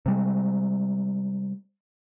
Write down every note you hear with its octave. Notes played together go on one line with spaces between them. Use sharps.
C3 G3 G#3